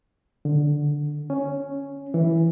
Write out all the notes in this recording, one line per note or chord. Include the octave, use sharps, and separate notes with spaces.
D3
C#4
E3